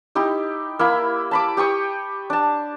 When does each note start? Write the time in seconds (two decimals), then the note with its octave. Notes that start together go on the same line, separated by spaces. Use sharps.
0.15 D#4 E4 G4
0.79 A#3 E4 B5
1.31 A5 B5 D6
1.57 G4 G5 C#6 D#6
2.30 D4 A5